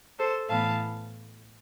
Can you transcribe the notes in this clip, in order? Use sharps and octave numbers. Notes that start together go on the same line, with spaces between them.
A4 C5
A2 E3 B3 F5 A5